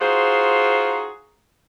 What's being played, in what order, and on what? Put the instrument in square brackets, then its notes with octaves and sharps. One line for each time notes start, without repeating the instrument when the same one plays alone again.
[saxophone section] D#4 F4 F#4 G#4 C5